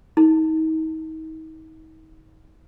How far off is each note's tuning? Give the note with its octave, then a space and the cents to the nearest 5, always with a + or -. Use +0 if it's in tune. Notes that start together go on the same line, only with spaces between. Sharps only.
D#4 +35